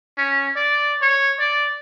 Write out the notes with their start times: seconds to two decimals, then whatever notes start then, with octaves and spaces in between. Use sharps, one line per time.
0.18 C#4
0.56 D5
1.02 C#5
1.40 D5